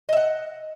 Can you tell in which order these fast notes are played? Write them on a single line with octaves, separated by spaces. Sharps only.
D#5 E5 F#5